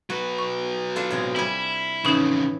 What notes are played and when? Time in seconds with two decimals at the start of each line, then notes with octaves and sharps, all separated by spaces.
0.10 F#3 F#4 B4
0.38 C#6
0.96 D4 F4 A4
1.11 A2 C3 G#3
1.36 G3 E4 G#5
2.05 F2 A2 C#3 E3 C#4 D#4